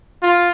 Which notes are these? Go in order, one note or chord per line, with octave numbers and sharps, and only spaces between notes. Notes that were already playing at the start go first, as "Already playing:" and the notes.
F4